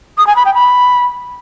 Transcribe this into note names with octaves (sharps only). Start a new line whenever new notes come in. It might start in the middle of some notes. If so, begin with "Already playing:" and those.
D#6
G#5
B5
G5
B5